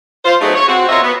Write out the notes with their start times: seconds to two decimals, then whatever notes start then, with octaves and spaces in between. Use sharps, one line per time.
0.25 F4 C5
0.41 F#3 A3 B3 C4 D#4 G#4
0.55 C#5
0.68 C4 F#4
0.89 F4 A#4 C5 C#5 D#5 E5
1.02 B3